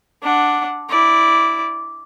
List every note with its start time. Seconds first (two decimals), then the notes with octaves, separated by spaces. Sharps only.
0.23 D4 F#5
0.89 E4 D5